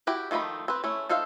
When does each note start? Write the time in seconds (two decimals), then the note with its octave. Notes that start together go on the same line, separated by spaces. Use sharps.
0.07 E4 F#4 G4 G5
0.31 D#3 F3 A3 D#4 B5
0.68 C4 B4
0.84 A3 C#4 E4
1.09 D#4 A4 C5 E5 F5